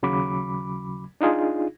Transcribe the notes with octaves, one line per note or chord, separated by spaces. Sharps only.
D#2 C#3 F#3 B5 D6
D4 D#4 F4 G#4